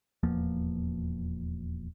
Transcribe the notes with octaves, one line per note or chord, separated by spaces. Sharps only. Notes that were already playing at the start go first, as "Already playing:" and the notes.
D#1 E2 F3 A#3